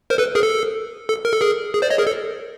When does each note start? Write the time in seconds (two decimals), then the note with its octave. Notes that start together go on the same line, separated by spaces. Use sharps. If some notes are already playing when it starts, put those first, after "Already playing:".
0.10 A#4 C5
0.18 A4 B4
0.35 G#4 A#4
0.43 A4
1.09 A4
1.25 A#4
1.33 A4
1.41 G#4 A#4
1.74 G#4
1.82 C5 D5
1.90 C#5 D#5
1.98 G#4 A#4
2.07 A4